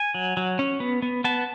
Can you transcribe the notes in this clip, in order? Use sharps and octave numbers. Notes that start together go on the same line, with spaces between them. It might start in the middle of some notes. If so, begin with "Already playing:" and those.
Already playing: G#5
F#3
F#3
C#4
B3
B3
B3 A5